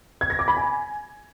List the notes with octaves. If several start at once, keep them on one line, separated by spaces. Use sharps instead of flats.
G#6
A#6
D6
B5
G#5